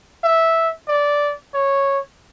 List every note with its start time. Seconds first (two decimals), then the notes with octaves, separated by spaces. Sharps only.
0.24 E5
0.88 D5
1.54 C#5